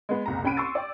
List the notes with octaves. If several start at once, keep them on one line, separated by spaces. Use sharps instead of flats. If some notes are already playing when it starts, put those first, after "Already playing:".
G#3 B3
F#1 C2 A#5
C2 C#4 G5 B5 D7 D#7
C6 C#6 E6 A6
D5 G5